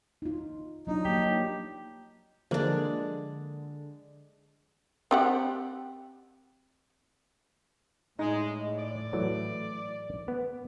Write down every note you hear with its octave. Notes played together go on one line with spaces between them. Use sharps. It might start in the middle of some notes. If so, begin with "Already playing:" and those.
D#4 F4
F#3 D4 D#4 F4
F#3 A#3 G4
D3 F3 G#3 A#3 D4
C4 G4 F#5
A2 G#3 D#4
D5
E3 F#3 A3
B3